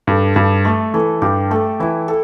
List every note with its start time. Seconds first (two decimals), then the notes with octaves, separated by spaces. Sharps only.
0.07 G2 A4
0.36 G2 A4
0.65 A3 A4
0.94 E3 A4
1.22 G2 G4
1.51 A3 A4
1.80 E3 E4
2.08 A4